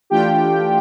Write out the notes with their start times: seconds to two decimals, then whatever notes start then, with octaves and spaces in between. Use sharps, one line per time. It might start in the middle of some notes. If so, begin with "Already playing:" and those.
0.10 E3 A3 D4 F4 G4 G5